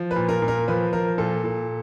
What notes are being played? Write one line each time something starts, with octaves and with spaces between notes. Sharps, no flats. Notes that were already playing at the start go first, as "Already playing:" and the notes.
Already playing: F3
B4
A#2
A#4
A#2
A#4
F3 B4
F3 A#4
A#2 A4
A#2